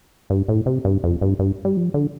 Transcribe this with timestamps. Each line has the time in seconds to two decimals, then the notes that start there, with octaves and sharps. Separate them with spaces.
0.30 G2
0.48 A2
0.66 C3
0.85 G2
1.04 F2
1.21 G2
1.39 G2
1.65 G3
1.77 F3
1.94 D3